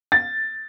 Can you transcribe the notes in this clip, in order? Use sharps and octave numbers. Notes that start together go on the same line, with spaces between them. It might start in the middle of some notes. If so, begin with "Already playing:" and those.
A6